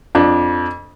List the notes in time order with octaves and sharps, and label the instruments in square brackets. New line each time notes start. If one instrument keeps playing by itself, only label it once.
[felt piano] F2 D4